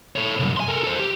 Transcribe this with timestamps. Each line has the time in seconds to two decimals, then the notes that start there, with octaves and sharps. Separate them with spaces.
0.16 A4 C#5
0.40 C2 F#2
0.57 G#5 C6
0.68 A4 A#4
0.84 A4 C5
1.00 G4